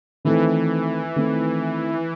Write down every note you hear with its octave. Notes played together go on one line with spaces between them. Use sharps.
D#3 E3 A3 C4
D#3 A3 C4